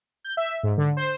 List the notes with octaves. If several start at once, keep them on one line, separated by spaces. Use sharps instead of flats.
G6
E5
G#2
D3
C5